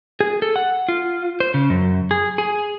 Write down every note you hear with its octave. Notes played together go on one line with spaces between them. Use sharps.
G#4
A4
F#5
F4
C5
C#3
F#2
G#4
G#4